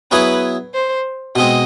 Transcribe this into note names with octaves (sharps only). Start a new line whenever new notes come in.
F#3 B3 E4 G#4 B4
C5
B2 G#3 C4 D#5